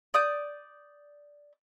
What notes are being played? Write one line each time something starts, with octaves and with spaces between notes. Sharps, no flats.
D5 D#6 G6